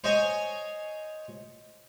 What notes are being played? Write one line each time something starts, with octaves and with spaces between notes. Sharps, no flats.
C5 C#5 D#5 G#5